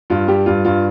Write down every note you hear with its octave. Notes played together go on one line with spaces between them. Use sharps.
G2 F4
G3 G4
G2 F4
G2 F4